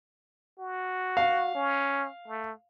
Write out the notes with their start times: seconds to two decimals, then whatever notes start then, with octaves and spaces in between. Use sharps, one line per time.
0.59 F#4
1.17 F5
1.55 C#4
2.28 A3